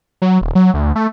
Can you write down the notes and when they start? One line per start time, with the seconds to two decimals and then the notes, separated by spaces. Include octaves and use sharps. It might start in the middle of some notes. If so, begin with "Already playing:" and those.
0.22 F#3
0.41 D#1
0.55 F#3
0.74 D2
0.95 A3